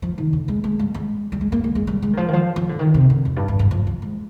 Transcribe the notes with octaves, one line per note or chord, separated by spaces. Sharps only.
F3
D#3
D3
G#3
G#3
G3
G#3
G3
G#3
A#3
G#3
G#3
G3
G#3
D#3
F3
D#3
F3
F3
D3
D#3
C3
D3
F2
G2
G2
G2
F3
F3
G#3